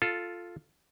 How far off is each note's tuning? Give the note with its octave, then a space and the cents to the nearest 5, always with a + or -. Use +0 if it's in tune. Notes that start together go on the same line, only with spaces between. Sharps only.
F4 +0 A4 +0